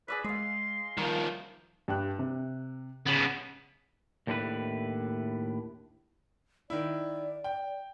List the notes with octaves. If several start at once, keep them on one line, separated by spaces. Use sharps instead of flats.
G#4 B4 D5 E5
G#3 D#5 F5 C6
D#3 F3 G3 A#3
G2 G5 F#6
C3
C#3 B3
D#2 A2 D4 E4 B4
D#3 E4 D5
G5